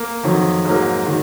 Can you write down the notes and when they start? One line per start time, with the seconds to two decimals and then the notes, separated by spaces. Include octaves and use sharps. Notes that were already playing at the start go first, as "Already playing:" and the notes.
Already playing: A#3
0.23 F2 D#3 F#3
0.65 G#2 F#3 A#3
1.06 D#3 F#3